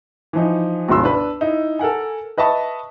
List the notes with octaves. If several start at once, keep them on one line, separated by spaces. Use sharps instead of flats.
E3 F3 D#4
G1 C#2 B2 E4 C6 E6
D4 B4
D#4 E4
A4 A#4 F#5 G#5
B4 D#5 E5 A5 C#6